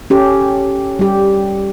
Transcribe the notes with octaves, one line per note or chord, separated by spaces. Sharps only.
C#4 G4 A4
G3 G4